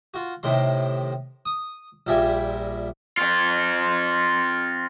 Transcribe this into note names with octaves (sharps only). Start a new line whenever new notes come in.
F4 F#4
A2 C3 D#3 C6
D#6
A#1 A#2 G3 E5 G#5
C4 F4